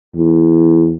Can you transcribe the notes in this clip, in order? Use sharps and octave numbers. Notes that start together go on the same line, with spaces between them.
E2